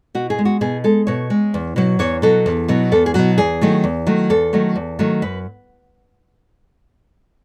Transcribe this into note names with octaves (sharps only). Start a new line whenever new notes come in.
B2 F#4
G#4
G#3
F#4
B2 G#4
G#3 A4
B2 C#5
G#3
E2
B2 F#3
E2 C#5
B2 F#3 A4
E2
B2 F#3
E2 A4
G#4
B2 F#3 F#4
E2 G#4
D#3 F#3 A3
E2
D#3 F#3 A3
E2 A4
D#3 F#3 A3
E2
D#3 F#3 A3
F#2 B4